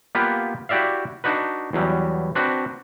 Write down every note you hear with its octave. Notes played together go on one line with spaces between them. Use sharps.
A#3 B3 F4 G4 B4
E4 F#4 G4 D5 E5 F5
D4 D#4 F#4 B4
E2 F#3 G3
C4 D4 F#4 B4